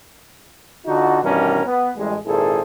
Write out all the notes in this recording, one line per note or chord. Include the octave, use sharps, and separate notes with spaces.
D3 D#4 F4 F#4
G2 B2 D#3 E3 C#4 A#4
B3
A1 A2 G3 G#3
G#1 A#2 E4 G#4 A4 C5